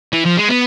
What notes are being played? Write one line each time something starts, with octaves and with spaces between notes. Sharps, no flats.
E3
F3
G#3
B3